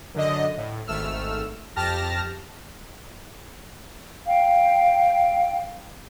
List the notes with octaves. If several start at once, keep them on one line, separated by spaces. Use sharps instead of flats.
F#2 D3 D#5
A2
G#1 A3 E6 F6
F2 G4 A5 F6 A#6
F5 G5